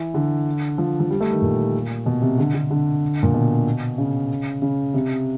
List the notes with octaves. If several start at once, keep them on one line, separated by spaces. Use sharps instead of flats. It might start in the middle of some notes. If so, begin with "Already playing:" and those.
Already playing: E3
D3
F3
F3
G3
A3
D#3
A#2
B2
C3
D3
D3
D3
A#2
B2
C#3
C#3
C3